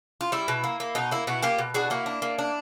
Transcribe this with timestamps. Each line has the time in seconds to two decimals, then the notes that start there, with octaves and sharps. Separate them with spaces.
0.21 F4
0.32 G3 E4
0.48 B2
0.64 A#3
0.80 A#3
0.95 B2 D#4
1.11 A#3 E4
1.27 B2 E4 F#4
1.42 A#3 F4 G4
1.58 B2
1.74 D4 F#4 G#4
1.90 A#3 E4 F#4
2.06 D4
2.22 A#3
2.39 D4